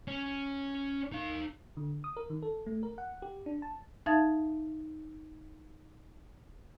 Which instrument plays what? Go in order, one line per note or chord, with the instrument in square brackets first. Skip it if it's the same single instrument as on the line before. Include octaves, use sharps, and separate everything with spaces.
[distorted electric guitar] C#4
D#4 F5
[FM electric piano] D3
D#6
A#4
D#3
A4
A3
A#4
F#5
G4
D4
A5
[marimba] D#4 E5 F5 A5 G#6 A6